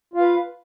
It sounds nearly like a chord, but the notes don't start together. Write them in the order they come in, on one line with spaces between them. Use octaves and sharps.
F4 F5 B4